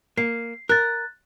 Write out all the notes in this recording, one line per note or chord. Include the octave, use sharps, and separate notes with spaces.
A#3 C7
A#4 F#6 A6